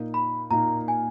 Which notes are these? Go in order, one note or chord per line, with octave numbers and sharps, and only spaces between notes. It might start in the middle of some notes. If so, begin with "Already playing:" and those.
Already playing: A#2 A#3 D#4
B5
A#2 A#3 D#4 A#5
G#5